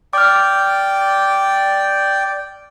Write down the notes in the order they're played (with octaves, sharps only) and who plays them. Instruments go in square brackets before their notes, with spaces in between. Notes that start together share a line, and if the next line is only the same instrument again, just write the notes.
[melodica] D5 G5 [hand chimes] D6 F6